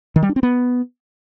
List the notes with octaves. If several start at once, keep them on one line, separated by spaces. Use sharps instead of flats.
D#3
G3
D4
C4
B3